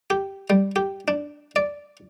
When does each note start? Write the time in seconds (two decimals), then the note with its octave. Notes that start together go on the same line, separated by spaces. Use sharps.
0.10 G4
0.50 G3
0.76 G4
1.08 D4
1.56 D5